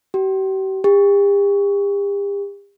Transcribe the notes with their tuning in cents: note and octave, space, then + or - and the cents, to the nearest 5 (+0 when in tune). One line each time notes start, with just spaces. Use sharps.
G4 -40
G4 +40